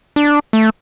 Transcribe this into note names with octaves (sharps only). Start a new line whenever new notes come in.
D4
A3